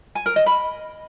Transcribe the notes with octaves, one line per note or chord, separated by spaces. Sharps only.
G#5
A#4
D#5
B5